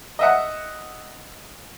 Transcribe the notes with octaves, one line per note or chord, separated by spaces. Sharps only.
D#5 E5 F#5